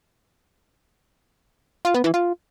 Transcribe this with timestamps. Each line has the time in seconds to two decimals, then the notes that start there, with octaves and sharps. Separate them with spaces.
1.85 F4
1.94 B3
2.04 E3
2.14 F4